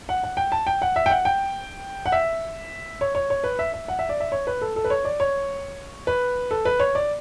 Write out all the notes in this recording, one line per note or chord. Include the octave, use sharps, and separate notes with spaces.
F#5
F#5
G5
A5
G5
F#5
E5
G5
F#5
G5
F#5
E5
C#5
C#5
C#5
B4
E5
E5
F#5
E5
D5
E5
C#5
B4
A4
A4
B4
C#5
D5
C#5
B4
A4
B4
C#5
D5